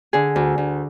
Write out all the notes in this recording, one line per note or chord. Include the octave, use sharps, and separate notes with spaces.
D3 G#4
D2
D2